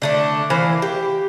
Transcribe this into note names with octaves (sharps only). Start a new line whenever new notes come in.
D3 A3 D4
E3 A#3 C5
G4